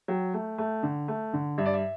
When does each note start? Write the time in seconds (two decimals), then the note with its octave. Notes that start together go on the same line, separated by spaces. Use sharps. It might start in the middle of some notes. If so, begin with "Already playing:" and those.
0.08 F#3 G5
0.34 A3
0.58 A3
0.83 D3
1.08 A3
1.33 D3
1.58 G2 E5
1.66 D5
1.74 E5